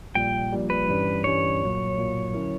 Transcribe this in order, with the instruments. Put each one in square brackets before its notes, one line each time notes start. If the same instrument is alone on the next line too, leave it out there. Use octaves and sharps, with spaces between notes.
[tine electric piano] A#1 A#2 G3 [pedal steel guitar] G5
[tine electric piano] A#1 A#2 G3
[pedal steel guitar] B4
[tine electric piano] G2 E3 G3 C#4
[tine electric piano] G2 E3 G3 C#4 [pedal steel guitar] C#5
[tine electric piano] B1 A#2 F#3 A#3
B1 A#2 F#3 A#3
D3 F#3 C#4 E4 A#4